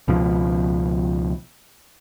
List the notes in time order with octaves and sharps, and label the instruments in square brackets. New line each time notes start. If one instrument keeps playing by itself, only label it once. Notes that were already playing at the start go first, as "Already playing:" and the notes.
[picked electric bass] C#2 B2 F3